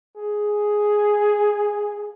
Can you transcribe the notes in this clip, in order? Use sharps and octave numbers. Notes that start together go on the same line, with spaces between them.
G#4